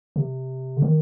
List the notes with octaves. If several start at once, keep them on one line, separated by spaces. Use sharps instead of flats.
C3
D3
D#3